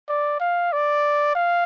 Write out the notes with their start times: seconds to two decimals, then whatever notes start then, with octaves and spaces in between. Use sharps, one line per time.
0.09 D5
0.40 F5
0.73 D5
1.35 F5